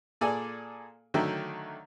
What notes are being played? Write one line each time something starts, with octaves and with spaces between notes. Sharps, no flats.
A#2 G#4 A4 D5 G#5
D3 D#3 F#3 A3 E5 G5